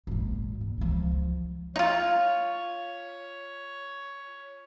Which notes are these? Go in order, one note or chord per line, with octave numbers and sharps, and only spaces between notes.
G#1 A#2
A#1
C#2 F3
D#4 F4 C#5